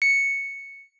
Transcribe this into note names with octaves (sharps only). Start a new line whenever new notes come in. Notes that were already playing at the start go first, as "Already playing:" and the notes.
C#7